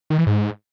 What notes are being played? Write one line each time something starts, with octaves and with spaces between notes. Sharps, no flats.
D#3
E3
G#2